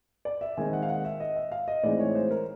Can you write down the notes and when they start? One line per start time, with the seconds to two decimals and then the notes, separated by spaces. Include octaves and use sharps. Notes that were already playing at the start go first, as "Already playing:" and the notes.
0.25 D5
0.41 E5
0.57 D#3 G#3 C4 D#4 G#5
0.73 F#5
0.83 F5
0.89 F#5
1.05 E5
1.20 D#5
1.36 E5
1.52 F5
1.68 D#5
1.83 A2 E3 G#3 C4 D#4 D5
1.99 C#5
2.15 C5
2.31 A#4